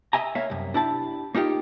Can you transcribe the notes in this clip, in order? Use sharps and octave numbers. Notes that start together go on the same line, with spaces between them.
D#5 E5 G#5 A#5
A#3 C#5 E5 F5
C2 F#2
D4 E4 G4 A5
A#3 D#4 F4 G4